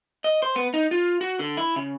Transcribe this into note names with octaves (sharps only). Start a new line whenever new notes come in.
D#5
C5
B3
D#4
F4
F#4
D3
E4
C#3